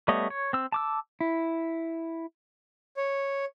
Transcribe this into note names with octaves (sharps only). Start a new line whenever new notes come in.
G3 A3 B3 C#5 D#5
C#5
C4 E6
A5 D6 E6
E4
C#5